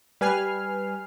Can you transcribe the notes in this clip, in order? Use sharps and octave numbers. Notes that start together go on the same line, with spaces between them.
G3 B4 G#5 F6 C7